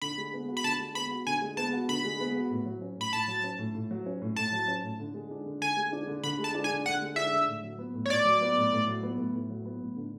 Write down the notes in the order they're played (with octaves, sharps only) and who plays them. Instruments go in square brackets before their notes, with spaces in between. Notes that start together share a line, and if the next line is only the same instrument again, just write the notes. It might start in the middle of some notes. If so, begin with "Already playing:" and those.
[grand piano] D3 [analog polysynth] B5
[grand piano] G#3
B3
F#4
[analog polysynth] B5
[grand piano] D3 [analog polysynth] A5
[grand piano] G#3
[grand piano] B3 [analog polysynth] B5
[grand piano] F#4
[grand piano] D3 [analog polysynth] G#5
[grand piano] G#3
[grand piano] B3 [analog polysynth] A5
[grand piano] F#4
[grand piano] D3 [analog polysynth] B5
[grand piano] G#3
B3
F#4
A2
F#3
C#4
[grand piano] A2 [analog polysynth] B5
[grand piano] A2 [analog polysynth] A5
[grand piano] F#3
C#4
A2
A2
F#3
C#4
A2
[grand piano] A2 [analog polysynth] A5
[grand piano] F#3
C#4
A2
D3
G#3
D4
D3
[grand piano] D3 [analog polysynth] G#5
[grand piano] G#3
D4
D3
[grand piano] D3 [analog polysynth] B5
[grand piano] G#3
[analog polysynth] A5
[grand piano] D4
[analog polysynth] G#5
[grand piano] D3
[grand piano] D3 [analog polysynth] F#5
[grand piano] G#3
[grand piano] D4 [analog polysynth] E5
[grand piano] D3
A2
F#3
B3
A2
[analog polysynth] C#5
[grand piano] A2 [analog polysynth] D5
[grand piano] F#3
B3
A2
A2
F#3
B3
A2
A2
F#3
B3
A2
D3